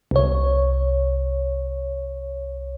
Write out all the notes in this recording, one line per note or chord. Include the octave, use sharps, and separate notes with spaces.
C2 C#5